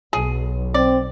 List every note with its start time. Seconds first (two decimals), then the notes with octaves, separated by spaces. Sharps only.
0.13 B1 G#4
0.74 C4 D5